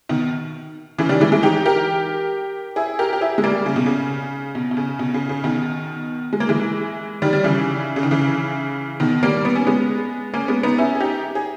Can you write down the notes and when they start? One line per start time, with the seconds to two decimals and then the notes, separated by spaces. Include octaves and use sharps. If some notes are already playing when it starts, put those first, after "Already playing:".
0.09 B2 D#3
0.98 C#3 E3
1.09 D#3 G3
1.20 E3 G#3
1.32 E3 G#3
1.43 D#4 G4
1.65 G4 A#4
2.76 E4 G#4
2.99 G4 A#4
3.13 G4
3.21 E4 G#4
3.38 G#3
3.44 G3 A#3
3.66 C#3
3.76 B2
3.86 C#3
4.55 B2
4.71 B2
4.77 C#3
4.99 B2
5.14 C#3
5.29 C#3
5.44 B2 D#3
6.33 G#3
6.40 A#3
6.49 E3 G#3
7.22 D#3 G3
7.33 G3
7.44 C#3 E3
7.96 C#3
8.03 D#3
8.11 C#3 E3
9.00 B2 D#3
9.23 G3 A#3
9.45 B3
9.55 C#4
9.67 G#3 B3
10.34 A#3 C#4
10.48 G#3 B3
10.63 B3 D#4
10.78 C#4 E4
10.95 G#4
11.00 D#4 G4
11.35 G#4